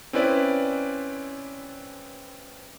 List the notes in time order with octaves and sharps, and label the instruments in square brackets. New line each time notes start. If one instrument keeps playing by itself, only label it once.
[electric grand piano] C4 C#4 E4 B4 D5